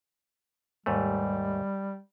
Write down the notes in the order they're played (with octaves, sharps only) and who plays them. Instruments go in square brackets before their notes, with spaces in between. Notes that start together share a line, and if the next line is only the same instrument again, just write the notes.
[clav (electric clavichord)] D#2 G#2 A3 [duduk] G3